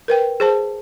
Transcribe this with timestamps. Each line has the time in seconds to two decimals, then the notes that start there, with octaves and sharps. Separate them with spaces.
0.08 A#4 B4 G5
0.40 G#4 C5 A5